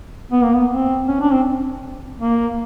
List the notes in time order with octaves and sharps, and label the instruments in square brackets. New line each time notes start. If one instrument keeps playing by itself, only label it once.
[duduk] B3
A#3
B3
C4
C#4
D4
C4
A#3